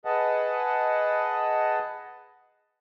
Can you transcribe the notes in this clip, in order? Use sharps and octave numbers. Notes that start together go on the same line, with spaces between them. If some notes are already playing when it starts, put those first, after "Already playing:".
G#4 B4 D#5 F#5 A5